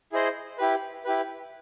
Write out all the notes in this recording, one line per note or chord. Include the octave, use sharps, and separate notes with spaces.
E4 G#4 C5 D#5
E4 G4 B4
E4 G4 B4